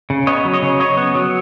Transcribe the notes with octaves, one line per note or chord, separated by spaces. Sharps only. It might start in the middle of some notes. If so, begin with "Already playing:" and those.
C#3
B3 C#5 D#5
F#3
C#5 D#5
C#3
C#3 C#5 D#5
B3
F#3